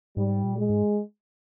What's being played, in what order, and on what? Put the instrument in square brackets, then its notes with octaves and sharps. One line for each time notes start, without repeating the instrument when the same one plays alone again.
[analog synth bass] G#2 [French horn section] G3
[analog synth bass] A#2
[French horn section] G#3
[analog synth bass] G#2